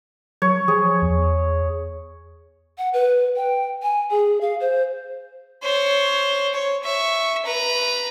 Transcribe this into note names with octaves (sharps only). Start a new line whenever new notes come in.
F#3 C#5
F3 G#4
E2
F#5
B4
G5
G#5
G#4
F5
C5
C5 C#5
C#5
E5 C#6
B4 A#5